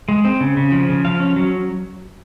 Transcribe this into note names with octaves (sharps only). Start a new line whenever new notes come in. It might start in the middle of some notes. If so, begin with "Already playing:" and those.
G#3
C4
C#3
C#3
F3
C#3
F3 F5
C#4
F#3